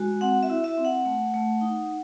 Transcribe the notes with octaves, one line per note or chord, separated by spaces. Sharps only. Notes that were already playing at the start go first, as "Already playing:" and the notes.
Already playing: G#3 F#4
C4 F#5
E5
E4
E5
C4
F#5
A3
A3
D#4